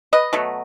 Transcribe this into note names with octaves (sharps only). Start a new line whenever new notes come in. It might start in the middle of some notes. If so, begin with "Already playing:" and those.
B4 D#5
B2 F#3 A3